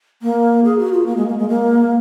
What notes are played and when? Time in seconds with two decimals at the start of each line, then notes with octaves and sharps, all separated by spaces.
0.22 A#3
0.64 G#4
0.79 F#4
0.92 F4
1.06 A#3
1.17 G#3
1.28 A#3
1.38 G#3
1.49 A#3